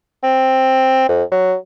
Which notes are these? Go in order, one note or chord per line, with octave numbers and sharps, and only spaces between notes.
C4
F2
F#3